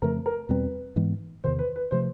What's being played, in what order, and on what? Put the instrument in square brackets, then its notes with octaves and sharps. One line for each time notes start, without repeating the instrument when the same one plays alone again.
[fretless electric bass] F2 C#3 F3 A3 [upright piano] A#4
[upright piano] A#4
[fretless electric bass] E2 B2 G3 C4 [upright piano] B4
[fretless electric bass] G#2 E3 G#3 B3
[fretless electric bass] E2 C3 D#3 [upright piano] C5
[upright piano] B4
B4
[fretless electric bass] C3 F3 A3 [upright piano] C5